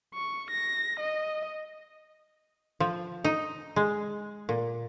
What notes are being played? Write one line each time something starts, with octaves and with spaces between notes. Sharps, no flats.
C#6
A#6
D#5
F3
D#4
G#3
A#2